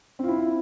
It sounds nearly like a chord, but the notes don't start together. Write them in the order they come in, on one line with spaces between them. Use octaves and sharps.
C4 F4 E4